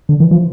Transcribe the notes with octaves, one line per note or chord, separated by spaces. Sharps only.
D3
E3
F3